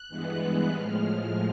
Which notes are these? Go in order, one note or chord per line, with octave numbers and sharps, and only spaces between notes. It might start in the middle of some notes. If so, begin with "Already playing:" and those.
Already playing: F#6
G2 E3 G#3 B3
A2 F3 G#3 F6